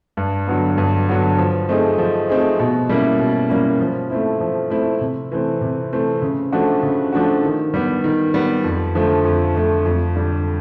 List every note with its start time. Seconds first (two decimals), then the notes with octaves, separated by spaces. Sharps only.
0.17 G2
0.47 D3 F#3 B3
0.78 G2
1.08 D3 F#3 B3
1.38 F3
1.69 A3 C4 D#4 G#4
1.98 F3
2.30 A3 C4 D#4 G#4
2.59 B2
2.89 G3 A#3 C#4 E4
3.19 B2
3.49 G3 A#3 C#4 E4
3.80 F3
4.10 A3 C4 E4
4.41 F3
4.70 A3 C4 E4
5.01 C3
5.32 E3 A3 C4
5.61 C3
5.92 E3 A3 C4
6.22 C#3
6.52 F3 A3 D4 F#4
6.83 C#3
7.13 F3 A3 D4 F#4
7.44 D#3
7.74 G3 B3
8.04 D#3
8.34 G3 B3
8.64 F2
8.95 D3 F3 A3
9.25 F2
9.55 D3 F3 A3
9.85 F2
10.16 D3 G3